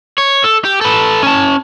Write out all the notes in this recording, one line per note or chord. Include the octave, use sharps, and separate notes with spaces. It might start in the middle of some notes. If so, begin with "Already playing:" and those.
C#5
A4
G4
A4 B4
C#4 A5